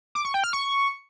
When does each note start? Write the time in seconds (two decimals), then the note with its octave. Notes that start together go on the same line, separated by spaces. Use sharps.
0.15 D6
0.25 C#6
0.34 G5
0.44 F6
0.53 C#6